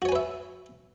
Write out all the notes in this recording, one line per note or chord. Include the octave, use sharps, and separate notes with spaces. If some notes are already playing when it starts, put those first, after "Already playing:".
F#4 B4 C#5 E5 G#5